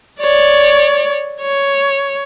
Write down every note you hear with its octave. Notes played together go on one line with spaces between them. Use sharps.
C#5 D5
C#5